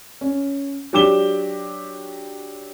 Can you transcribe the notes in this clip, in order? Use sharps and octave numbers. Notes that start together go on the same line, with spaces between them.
C#4
F#3 D4 G4 D6 E7 G7